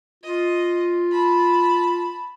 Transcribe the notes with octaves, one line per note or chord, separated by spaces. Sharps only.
F4 D#5
A5 B5